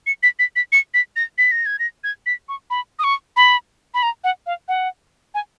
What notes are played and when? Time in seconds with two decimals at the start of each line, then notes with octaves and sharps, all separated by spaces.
0.07 C#7
0.23 B6
0.39 B6
0.56 B6
0.72 C#7
0.94 B6
1.16 A#6
1.38 B6
1.51 A#6
1.66 G#6
1.79 A#6
2.04 G#6
2.26 B6
2.49 C#6
2.70 B5
2.99 D#6
3.04 C#6
3.36 B5
3.94 B5
4.03 A#5
4.24 F#5
4.46 F5
4.68 F#5
5.34 G#5